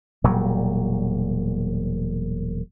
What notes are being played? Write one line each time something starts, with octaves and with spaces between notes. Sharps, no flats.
E1 A#2 F#3 G3